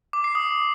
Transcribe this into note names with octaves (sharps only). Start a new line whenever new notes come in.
D6
C7
D#6